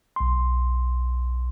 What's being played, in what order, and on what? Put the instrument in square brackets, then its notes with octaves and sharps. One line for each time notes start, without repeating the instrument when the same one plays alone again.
[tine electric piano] B1 C6